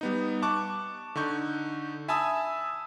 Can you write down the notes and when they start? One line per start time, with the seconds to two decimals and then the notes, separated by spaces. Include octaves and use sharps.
0.01 G3 B3 D#4
0.42 A5 C#6 D6 F#6
1.15 D3 D#4 C#6 G6
2.08 E5 G#5 A5 B5 D#6 E6